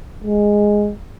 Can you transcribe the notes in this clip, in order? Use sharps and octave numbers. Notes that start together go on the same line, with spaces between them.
G#3